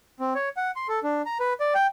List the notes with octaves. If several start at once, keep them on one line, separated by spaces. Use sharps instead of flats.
C4
C#5
F#5
C6
A4
D4
A#5
B4
D5
G5